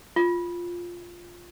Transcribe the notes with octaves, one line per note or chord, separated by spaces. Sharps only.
F4